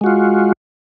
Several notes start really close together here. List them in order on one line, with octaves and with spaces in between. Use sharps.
G#3 F#4 F4